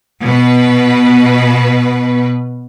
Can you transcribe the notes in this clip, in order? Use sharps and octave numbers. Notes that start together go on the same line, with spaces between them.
B2 B4